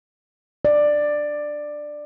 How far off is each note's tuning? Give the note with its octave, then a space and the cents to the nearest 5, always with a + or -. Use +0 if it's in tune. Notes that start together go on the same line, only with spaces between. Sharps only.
D5 +10